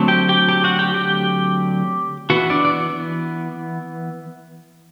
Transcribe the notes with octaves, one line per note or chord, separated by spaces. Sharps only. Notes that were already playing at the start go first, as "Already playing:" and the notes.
Already playing: D3 F#3 A3 C4
G4 G5
G4 G5
G4 G5
F#4 F#5
G4 G5
G4 G5
E3 B3 F#4 F#5
D4 D5
D5